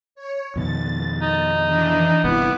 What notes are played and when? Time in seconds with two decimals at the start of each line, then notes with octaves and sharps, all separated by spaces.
0.15 C#5
0.56 F2 B2 D#3 A6
1.22 D#4
1.66 E3 D4
2.24 G1 G2 C3 B3 E4 D6